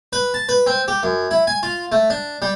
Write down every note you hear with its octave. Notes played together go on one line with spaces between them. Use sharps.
B4
A5
B4
C4
G4
F#2
E4
G#5
F4
A3
D4
G3